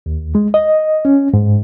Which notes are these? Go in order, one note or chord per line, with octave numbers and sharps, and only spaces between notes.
D#2
G#3
D#5
C#4
G#2